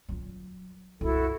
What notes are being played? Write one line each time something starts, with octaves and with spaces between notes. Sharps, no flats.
F#3 F4
C2 F#2 E4 F#4 A4